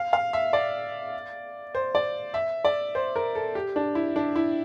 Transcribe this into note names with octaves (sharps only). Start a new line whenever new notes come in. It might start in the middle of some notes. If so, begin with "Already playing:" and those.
Already playing: F5
F5
E5
D5
C5
D5
E5
D5
C5
A#4
A4
G4
D4
E4
D4
E4